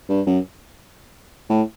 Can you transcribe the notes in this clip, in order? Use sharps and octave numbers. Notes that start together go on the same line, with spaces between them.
G2
F#2
A2